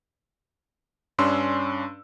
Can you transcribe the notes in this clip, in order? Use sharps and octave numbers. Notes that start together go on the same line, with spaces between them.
G2 C#4 D4 C6 E6